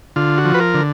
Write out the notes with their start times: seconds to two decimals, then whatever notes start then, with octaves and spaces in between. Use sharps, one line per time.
0.16 D3 F4
0.38 F#4
0.45 F3
0.54 B4
0.60 A#4
0.74 D3